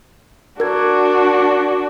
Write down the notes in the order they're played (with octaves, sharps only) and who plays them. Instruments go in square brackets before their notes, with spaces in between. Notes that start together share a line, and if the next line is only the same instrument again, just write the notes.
[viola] D4 F#4 [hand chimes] A#4 G#6